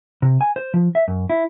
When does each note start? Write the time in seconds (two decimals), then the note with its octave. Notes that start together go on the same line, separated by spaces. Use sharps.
0.22 C3
0.41 G#5
0.56 C5
0.74 F3
0.95 E5
1.08 F#2
1.30 E4